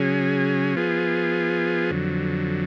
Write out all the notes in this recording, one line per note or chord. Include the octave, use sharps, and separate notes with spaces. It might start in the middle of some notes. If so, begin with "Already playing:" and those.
Already playing: C#3 F#3 C#4 G#4
F3 B3 F4 G#4
F2 D3 F#3